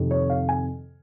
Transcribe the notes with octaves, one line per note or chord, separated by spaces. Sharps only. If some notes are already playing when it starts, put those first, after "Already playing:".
Already playing: F2 C3 D#3
C#5
F5
G#5